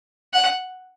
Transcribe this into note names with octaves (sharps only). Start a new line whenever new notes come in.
F#5